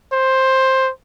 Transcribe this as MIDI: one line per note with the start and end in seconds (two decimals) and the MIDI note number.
0.12 0.91 72